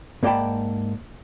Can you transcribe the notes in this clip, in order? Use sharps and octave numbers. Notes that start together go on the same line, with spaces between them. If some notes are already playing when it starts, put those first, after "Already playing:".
G#2 A#3 D5 G5 A5 B5